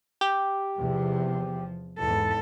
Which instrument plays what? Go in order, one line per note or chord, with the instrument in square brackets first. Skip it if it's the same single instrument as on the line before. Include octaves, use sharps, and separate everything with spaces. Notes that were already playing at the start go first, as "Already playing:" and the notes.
[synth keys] G4
[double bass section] E2 C3 [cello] F3
[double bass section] E2 G#2 [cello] A4